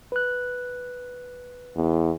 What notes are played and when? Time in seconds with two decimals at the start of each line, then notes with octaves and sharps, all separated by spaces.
0.12 B4 F#6
1.76 E2